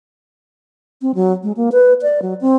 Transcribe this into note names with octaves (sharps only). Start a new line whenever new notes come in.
C4
F#3
G#3
A#3
B4
D5
F#3
C4